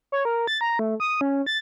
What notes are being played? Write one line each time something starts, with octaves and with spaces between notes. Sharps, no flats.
C#5
A#4
A6
A#5
A3
D#6
C#4
A6